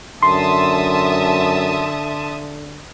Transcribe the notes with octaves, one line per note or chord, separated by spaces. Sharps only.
F#2 D3 E5 A5 C6 D#6